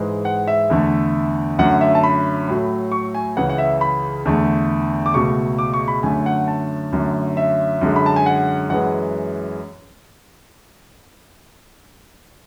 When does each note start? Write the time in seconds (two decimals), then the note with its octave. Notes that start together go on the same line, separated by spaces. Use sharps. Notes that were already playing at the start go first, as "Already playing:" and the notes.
Already playing: G#2 E3 G#3
0.25 F#5
0.48 E5
0.70 E2 D3 A3
1.58 F#2 D3 A3 F#5
1.81 E5
1.95 A5
2.04 B5
2.48 A2 F#3 A3
2.92 C#6
3.15 G#5
3.37 C#2 C#3 E3 F#5
3.49 F#5
3.58 E5
3.81 B5
4.25 E2 D3 A3
5.06 D6
5.14 C#2 B2 A3 C#6
5.58 D6
5.74 C#6
5.88 B5
6.03 F#2 D3 A3 G#5
6.26 F#5
6.48 A5
6.93 F#2 D3 A3
7.37 E5
7.81 F#2 D3 G#3
7.96 B5
8.06 A5
8.16 G#5
8.26 F#5
8.70 F#2 E3 G#3 F#5